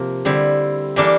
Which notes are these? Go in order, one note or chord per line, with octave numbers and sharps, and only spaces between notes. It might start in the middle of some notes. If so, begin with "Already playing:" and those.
Already playing: C3 F3 A#3
D3 G3 C4 E4
E3 G3 A#3 D4 A4